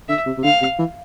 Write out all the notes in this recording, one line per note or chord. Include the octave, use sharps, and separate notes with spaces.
D3 E5
C3
C3
D3 F5
C3
E3